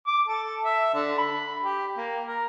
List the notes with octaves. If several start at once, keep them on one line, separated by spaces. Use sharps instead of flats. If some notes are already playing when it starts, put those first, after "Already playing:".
D6
A4
E5
D3
B5
G4
A#3
A#4